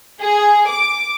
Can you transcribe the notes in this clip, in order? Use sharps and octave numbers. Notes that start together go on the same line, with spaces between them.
G#4
D6